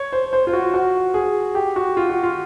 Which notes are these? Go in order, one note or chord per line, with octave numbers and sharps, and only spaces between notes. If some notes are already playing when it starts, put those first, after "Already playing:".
Already playing: C#5
C5
C5
F4
F#4
F#4
G#4
G4
F#4
F4
F#4
F4